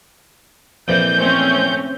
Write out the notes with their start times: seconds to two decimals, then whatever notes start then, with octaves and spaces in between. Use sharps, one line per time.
0.88 F2 A#2 E3 G6
1.18 A3 C4 C#4